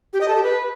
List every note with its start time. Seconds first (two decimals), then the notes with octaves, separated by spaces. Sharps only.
0.13 G4
0.21 D#5
0.28 A4
0.36 G4
0.43 B4